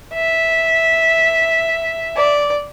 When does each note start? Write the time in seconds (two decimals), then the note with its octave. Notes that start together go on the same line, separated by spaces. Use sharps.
0.14 E5
2.17 D5